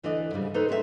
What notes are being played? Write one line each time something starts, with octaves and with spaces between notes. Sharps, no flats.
D2 E3 D4 A4 D#5
G#2 C#3 G3
D#4 A4 B4 C5
G#3 A3 C4 C#4 A4 E5